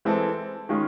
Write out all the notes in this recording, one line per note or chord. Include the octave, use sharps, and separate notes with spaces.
E3 G#3 C4 E4 A4
D#3 G#3 C#4 F4 G#4